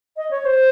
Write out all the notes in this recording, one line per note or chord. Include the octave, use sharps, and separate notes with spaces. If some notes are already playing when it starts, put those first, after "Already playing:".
D#5
C#5
C5